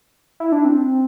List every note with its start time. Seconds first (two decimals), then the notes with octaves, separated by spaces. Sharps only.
0.40 E4
0.52 D4
0.65 C4